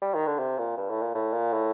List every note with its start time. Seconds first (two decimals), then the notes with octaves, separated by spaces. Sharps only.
0.02 G3
0.14 D#3
0.27 D3
0.39 C3
0.58 A#2
0.77 G2
0.90 A2
1.02 A#2
1.15 A2
1.33 A#2
1.53 A2